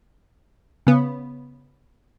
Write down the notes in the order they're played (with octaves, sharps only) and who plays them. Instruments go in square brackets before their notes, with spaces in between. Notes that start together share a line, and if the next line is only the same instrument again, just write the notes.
[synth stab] C#3 B3